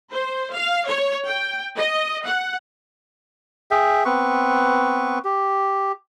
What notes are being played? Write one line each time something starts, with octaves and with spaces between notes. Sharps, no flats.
C5
F5
C#5
G5
D#5
F#5
G#4 E5 G5
B3 C4 B4 C#6
G4